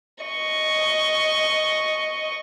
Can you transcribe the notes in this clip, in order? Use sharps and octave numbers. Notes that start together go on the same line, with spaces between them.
D#5 C#6